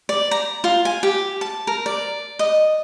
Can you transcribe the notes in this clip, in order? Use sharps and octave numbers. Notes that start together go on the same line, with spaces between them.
D5
A#5
F4
G#5
G4
A5
A#4
D5
D#5